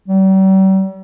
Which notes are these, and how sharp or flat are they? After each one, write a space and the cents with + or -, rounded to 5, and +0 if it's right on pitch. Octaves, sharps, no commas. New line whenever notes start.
G3 -45